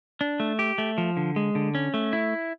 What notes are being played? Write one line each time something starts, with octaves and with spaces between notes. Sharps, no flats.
D4
A3
G4
A3
F3
D3
G#3
D3
C#4
A3
E4